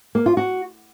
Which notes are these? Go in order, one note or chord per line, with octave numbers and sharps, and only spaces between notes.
A#3
F4
F#4